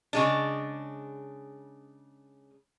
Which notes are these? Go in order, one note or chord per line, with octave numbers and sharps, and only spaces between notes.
C#3 G#3 D4